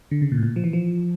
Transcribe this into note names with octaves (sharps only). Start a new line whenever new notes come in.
D3
C#3
A#2
A2
A#2
F3
E3
F3